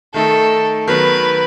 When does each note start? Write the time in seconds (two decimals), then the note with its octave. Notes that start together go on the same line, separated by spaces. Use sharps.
0.14 D#3 A3 D#4 A4
0.87 D#3 F#3 B3 B4